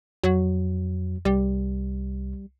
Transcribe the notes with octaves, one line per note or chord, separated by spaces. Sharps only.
F2 F#3
C2 G3